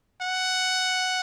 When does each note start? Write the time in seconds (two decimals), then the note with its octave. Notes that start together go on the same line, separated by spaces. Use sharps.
0.21 F#5